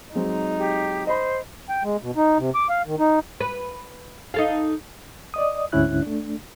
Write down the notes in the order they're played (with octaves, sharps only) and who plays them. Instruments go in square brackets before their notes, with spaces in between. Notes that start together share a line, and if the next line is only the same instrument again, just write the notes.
[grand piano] F#3 G#3 C4 [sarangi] D#4
[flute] G4
[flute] C5 [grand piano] D#5 B5
[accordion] G5
G#3
B2
D#4
C3
D6
F5
D#3
D#4
[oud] B4
D#4 A4 F5
[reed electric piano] D5 D#5 D#6
D2 G#2 D3 C#4 E4 F#6
A3 D4